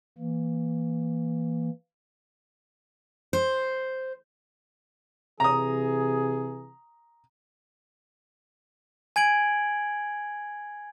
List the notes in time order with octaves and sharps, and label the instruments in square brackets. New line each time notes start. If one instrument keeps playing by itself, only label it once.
[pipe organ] E3 A#3
[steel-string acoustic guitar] C5
[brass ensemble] C3 E3 G#4 [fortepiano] A#5 D#6
[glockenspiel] G#5 G#6 D7 F#7